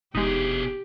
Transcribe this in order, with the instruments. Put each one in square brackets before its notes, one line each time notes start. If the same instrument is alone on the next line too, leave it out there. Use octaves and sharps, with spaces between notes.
[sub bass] F1 [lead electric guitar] B2 G#4 [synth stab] G#3 D#4 [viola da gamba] G4